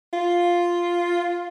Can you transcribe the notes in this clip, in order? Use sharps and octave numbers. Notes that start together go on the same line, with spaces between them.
F4